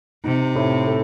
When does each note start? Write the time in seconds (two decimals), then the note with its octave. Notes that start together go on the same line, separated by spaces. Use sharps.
0.24 C3 D#4
0.55 A2
0.87 A4